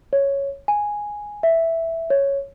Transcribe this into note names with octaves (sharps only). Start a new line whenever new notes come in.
C#5
G#5
E5
C#5